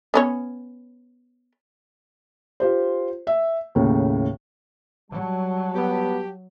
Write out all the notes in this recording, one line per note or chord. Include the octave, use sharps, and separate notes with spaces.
B3 C#4 C#5
F4 G4 C5
E5
D#2 A2 C#3
F#3 G3 A5
B3 G4